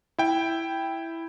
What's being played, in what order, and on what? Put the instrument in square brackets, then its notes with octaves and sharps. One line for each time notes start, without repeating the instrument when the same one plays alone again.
[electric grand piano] E4 G5